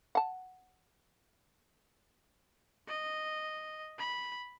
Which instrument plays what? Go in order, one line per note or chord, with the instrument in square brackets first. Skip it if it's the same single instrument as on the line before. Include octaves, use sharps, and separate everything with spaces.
[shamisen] F#5 A5
[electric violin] D#5
B5